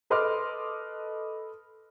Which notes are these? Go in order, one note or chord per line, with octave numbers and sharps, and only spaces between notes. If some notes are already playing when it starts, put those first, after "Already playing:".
A4 B4 D#5 C6 D6 F6